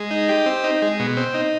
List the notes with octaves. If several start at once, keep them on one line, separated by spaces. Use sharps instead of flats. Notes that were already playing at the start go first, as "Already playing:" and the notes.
Already playing: G#3
D#4
G4
C4
D#4
G#3
B2
C4
D#4